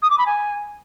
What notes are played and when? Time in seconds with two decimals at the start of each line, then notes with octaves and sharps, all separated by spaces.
0.02 D#6
0.10 D6
0.18 B5
0.26 G#5